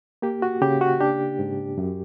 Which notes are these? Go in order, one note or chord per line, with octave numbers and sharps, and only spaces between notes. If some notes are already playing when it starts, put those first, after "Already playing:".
A#3 G4
F#4
C#3 G4
F#4
D4 G4
G#2
F#2